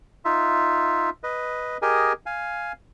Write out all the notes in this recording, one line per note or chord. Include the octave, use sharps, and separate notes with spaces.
D#4 F4 E5
B4 D#5
G4 G#4 A#4 D#5 G#5
F5 G#5